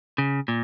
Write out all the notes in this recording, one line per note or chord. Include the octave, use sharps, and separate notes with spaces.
C#3
A#2